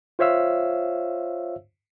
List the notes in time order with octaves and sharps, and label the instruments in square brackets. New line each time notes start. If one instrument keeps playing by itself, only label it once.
[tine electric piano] F4 C5 C#5 E5 F5 E6